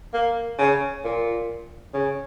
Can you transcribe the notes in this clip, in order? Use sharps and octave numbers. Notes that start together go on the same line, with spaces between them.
A#3
C#3
A#2
C#3